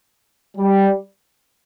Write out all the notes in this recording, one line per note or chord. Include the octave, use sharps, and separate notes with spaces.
G3